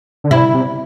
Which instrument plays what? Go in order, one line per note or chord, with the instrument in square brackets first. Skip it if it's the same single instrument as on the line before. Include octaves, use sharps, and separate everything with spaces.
[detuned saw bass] D3
[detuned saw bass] C3 [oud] E4
[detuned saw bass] C3